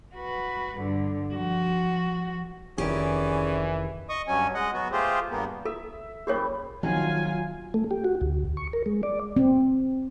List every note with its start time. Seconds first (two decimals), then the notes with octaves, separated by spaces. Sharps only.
0.15 F#4 B4
0.78 G2 D3
1.33 F3 F#4
2.78 F1 D#3 E3 C#4 G4 G#4 D5
4.09 D#5 C#6 D#6
4.28 G2 F#3 C#4 G#5
4.54 G#3 D#5 F#5
4.73 F#3 B3 F#4
4.92 A3 F4 G4 G#4 C5
5.30 G2 A#3 B3
5.65 A4 E5
6.27 F#2 G3 G#4 A#4 C5 C#5
6.83 A#1 D#3 F#3 D#4 F4 G#5
7.74 A3
7.91 G4
8.04 F#4
8.21 D2
8.57 C#6
8.73 A#4
8.86 G#3
9.03 D5
9.37 C4